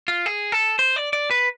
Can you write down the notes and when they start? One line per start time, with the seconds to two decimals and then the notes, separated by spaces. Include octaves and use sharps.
0.08 F4
0.26 G#4
0.52 A4
0.79 C5
0.96 D5
1.13 D5
1.31 B4